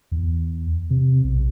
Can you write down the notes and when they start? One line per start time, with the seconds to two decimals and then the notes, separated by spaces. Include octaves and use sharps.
0.12 E2
0.90 C3
1.24 B1